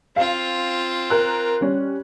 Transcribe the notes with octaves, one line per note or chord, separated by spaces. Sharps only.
C4 F4 F5
A#4 F#6
G3 C#4